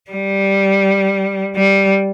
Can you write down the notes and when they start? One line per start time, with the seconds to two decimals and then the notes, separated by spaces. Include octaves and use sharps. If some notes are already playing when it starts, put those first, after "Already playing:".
0.11 G3
1.56 G3